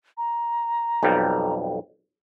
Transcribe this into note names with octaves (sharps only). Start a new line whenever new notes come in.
A#5
B1 F2 G3